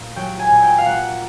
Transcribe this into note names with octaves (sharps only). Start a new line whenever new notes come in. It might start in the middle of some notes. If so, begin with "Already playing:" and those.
Already playing: A#2
F#3 G5
G#5
A#2
G5
F5
A#3 F#5